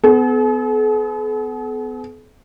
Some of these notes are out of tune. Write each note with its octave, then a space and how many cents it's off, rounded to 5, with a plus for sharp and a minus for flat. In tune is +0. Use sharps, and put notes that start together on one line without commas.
B3 +30 A4 -45